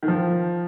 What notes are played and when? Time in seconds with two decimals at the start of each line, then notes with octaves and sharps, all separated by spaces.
0.03 D#3
0.08 F3